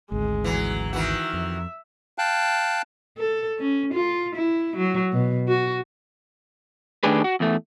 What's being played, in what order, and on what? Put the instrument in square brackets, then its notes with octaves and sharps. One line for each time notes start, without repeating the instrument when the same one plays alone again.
[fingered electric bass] G#1 D2 [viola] G#3
[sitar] E3 F#3
[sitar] D#3 E3 F#4 [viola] E5
[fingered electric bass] F2
[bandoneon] F5 G5 A5 F#6
[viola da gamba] A4
C#4
F4
E4
F#3
B2
F#4
[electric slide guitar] D#3 A3 D4 G4 G#4 B4
F#4
E2 A3